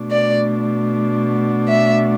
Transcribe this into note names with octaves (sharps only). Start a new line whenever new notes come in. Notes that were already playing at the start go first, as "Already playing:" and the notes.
Already playing: B2 A3 D4
D5
E5